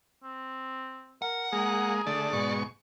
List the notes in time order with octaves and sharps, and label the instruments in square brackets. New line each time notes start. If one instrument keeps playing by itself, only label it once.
[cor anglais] C4
[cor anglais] A#4 [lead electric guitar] F#5
[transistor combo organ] G#3 A#3 [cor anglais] G#4
[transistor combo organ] D3 A3 [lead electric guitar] D5
[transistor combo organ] G#2 B2 C#6